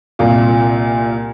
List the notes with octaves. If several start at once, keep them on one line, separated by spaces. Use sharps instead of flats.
C2 A#2 F4